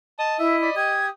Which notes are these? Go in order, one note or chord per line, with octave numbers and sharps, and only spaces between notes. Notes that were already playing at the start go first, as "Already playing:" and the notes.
D#5 A5
E4 E5
D5 B5
G4 D#6 G#6